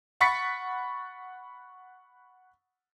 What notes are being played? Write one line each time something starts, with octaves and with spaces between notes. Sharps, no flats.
F#5 B5 C#6 A6 B6 C#7